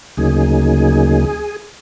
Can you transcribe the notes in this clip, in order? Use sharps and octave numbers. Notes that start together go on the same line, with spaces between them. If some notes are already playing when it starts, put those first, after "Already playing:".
D2 C#3 F#3 A#3 D#4 G#4 G#5